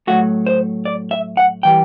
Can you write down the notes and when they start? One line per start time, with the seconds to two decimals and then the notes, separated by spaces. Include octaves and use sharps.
0.07 A2 F#3 A3 F#4
0.46 C5
0.85 D5
1.11 E5
1.37 F#5
1.63 E3 G3 G5